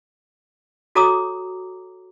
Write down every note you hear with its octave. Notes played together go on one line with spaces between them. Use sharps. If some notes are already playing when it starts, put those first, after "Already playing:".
F#4 A4 C#5 A#5 D6 D#6